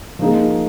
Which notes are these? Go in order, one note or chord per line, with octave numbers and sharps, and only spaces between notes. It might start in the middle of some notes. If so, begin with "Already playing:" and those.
F3 A#3 D#4 G#4